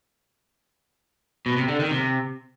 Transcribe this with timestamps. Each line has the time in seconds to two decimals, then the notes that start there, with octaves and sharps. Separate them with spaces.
1.46 B2
1.57 C3
1.68 D3
1.79 D#3
1.91 C3